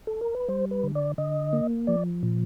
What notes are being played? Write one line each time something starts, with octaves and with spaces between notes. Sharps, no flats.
A4
A#4
B4
G3 C5
B4
D3
D5
D3 D#5
A#3
F3 D5
A#2